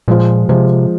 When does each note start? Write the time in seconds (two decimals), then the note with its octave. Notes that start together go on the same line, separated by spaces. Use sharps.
0.08 A#2 F3 G#3 F4 C5
0.49 C3 F3 G#3 F4 C5